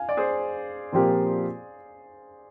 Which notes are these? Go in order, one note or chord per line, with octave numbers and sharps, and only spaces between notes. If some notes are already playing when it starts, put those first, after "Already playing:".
Already playing: F5 G#5
D5
G#4 C5
A#2 F3 C4 G4 A#4